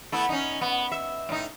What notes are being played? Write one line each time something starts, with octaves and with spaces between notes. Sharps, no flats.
A3 B3 E4
C#4 D#4
B3
E5
A2 D#4